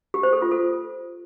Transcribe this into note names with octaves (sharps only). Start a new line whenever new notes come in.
G4
C5
A4
F4
A4